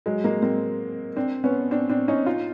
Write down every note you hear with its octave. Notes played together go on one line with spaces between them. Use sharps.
F#3 G#3
G#3 A#3
A#3 C4
C4 D4
B3 C#4
C4 D4
C4 D4
C#4 D#4
D#4 F4